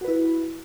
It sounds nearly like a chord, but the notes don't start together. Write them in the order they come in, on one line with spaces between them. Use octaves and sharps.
F#4 B4 E4